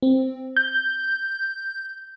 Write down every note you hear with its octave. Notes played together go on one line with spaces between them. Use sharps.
C4
G6